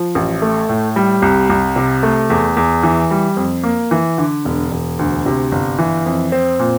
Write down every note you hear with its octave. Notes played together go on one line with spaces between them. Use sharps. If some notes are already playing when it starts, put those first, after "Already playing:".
Already playing: F3
A1
A3
A2
G3
C2
C2
C3
A3
E2
E2
E3
G3
F2
A#3
E3
D3
E1
E1
D2
C3
G1
E3
F2
C4
A#2